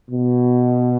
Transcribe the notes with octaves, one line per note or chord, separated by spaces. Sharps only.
B2